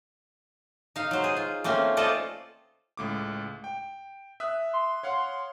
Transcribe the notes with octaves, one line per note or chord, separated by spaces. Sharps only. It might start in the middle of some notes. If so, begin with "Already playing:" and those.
D#4 F5
F#3 C5
G#4
F4
A3 A#3 C4 C#4
C4 F4 A4 C5 D5 D#5
C#2 A2 D6
G5
E5 D#6 F#6
C6
C#5 F5 F#5